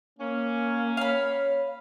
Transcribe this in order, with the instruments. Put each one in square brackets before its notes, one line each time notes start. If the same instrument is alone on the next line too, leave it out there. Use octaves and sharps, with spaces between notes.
[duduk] A#3 [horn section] C#4
[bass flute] C#5 [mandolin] F5 B5